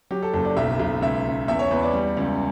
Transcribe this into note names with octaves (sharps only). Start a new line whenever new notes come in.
F#3 G4
A4
F#1 A4
D5
B1 E5
B1
C#2 E5
C#2
E2 E5
C#5
E2 B4
D5
G3
C#2